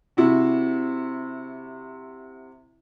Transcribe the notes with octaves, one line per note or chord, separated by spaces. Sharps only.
C3 E4 F#4